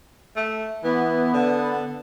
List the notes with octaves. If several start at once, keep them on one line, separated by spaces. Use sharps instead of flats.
A3
E3 B3
D3